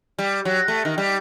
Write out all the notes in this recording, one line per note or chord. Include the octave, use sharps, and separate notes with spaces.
G3
F#3
A3
D#3
G3